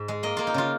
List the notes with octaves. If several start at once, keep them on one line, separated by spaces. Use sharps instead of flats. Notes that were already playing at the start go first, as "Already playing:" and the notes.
Already playing: G#2
G#3
A#3 D#5
A#3 F4
D#4
C#3 F4